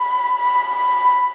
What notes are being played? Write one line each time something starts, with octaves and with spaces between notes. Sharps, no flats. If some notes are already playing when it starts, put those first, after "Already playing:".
Already playing: B5
B5
B5